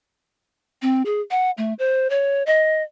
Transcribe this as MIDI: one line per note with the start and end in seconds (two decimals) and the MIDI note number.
0.82 1.02 60
1.05 1.21 68
1.31 1.51 78
1.58 1.74 57
1.79 2.10 72
2.10 2.43 73
2.46 2.83 75